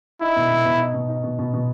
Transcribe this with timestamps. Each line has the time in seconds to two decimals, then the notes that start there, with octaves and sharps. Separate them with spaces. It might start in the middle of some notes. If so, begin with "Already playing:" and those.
0.21 D#4 E4
0.36 B2
0.50 B2
0.65 B2
0.80 D#4
0.94 B2
1.09 D#4
1.24 B2
1.39 B2
1.54 B2